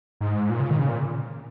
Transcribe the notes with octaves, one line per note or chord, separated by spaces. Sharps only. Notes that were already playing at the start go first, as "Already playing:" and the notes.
G#2
A#2
C#3
D#3
C#3
A#2